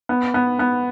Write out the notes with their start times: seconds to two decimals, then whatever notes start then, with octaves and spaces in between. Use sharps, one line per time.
0.09 B3
0.34 B3
0.59 B3